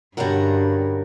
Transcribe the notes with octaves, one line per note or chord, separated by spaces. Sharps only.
G2 D3 G3 C#4 F#4 A#4